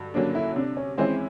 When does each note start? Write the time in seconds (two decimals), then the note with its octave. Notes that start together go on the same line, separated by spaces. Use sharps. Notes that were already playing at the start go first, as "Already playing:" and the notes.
Already playing: G2 D3 F#3
0.14 D3 F#3 A#3 C#4 D4
0.35 E4
0.56 C3 D4
0.77 C#4
0.98 E3 G#3 C4 C#4 E4